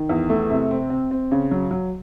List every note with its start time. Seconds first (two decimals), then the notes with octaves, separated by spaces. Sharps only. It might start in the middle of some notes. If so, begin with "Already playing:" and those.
Already playing: D#3
0.09 E2
0.30 A3
0.50 C3
0.71 C4
0.90 C4
1.11 C4
1.32 C#3
1.51 F#3
1.71 F#3